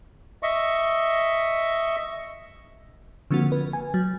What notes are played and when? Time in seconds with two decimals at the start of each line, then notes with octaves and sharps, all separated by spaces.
0.43 D#5 E5 C#6
3.31 D3 F3 A#3 C4 F#4
3.52 B4
3.73 G#5
3.94 F#3